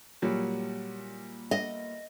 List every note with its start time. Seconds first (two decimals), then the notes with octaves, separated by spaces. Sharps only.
0.22 A#2 F#3 G3
1.51 D#5